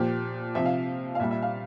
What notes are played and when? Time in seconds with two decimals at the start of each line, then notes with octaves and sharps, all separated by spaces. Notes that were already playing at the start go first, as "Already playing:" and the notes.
Already playing: A#2 F3 G4
0.55 C3 F3 E5
0.66 F5
1.15 F5
1.20 A#2 E5
1.23 G3
1.31 E5
1.42 F5